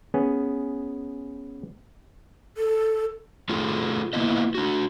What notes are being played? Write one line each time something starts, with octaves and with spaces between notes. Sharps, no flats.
B3 C#4 G#4
A4
A3 F4 F#4 G#4 A4
A#3 B3 E4 F4 D#5
D4 F#4